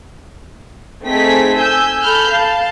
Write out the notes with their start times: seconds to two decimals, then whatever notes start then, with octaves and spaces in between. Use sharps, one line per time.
1.04 A3 C4 D#4 G#4 B6
1.57 G#5 E6 G6
2.01 A4 B5 F6 G6
2.30 F5 A5